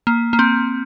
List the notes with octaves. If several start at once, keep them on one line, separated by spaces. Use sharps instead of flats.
A#3
A#3
C4